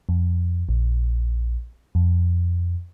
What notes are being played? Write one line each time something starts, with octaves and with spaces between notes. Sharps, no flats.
F2
A#1
F2